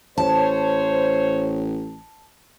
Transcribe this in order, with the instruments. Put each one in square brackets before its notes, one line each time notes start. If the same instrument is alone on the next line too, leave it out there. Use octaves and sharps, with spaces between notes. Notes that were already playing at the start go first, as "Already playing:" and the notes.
[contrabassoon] A1 [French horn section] C5 C#5 [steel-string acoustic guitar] A5